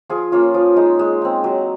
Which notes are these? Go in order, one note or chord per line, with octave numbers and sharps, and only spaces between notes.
F3 F4 G#4
A#3 C#4 F4
F3
G#3 D#4
G#3
C4 D#4
F#3